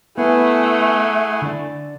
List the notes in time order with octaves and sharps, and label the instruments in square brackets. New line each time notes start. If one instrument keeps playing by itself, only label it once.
[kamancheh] A3 [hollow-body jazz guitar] B3 [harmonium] E4 [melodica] G#4 F#5 G#5
[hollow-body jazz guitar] D3 D4